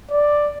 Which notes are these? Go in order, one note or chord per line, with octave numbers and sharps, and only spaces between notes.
D5